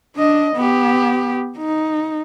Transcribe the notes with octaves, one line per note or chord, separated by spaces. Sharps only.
D4 D#5
B3 G4
D#4